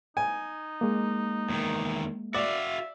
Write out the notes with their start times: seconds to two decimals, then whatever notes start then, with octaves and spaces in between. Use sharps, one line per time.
0.17 D#4 G#5
0.81 G#3 A#3
1.49 E2 D#3
2.34 F#4 D5 E5 F5